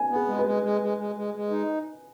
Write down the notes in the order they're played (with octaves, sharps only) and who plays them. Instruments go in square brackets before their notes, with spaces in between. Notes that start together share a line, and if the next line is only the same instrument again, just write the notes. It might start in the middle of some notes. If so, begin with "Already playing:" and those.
Already playing: [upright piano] G#5
[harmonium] B3
[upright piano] G#4
[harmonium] G#3
[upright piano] B4
[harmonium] G#3
G#3
G#3
G#3
G#3
G#3
D#4